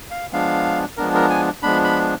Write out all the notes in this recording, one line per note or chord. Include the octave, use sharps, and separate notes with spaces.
F5
F3 G#3 B3 D4 F5
F3 G#3 B3 D4 A#4
A#4
G#5
F3 G#3 B3 D4 B5
B5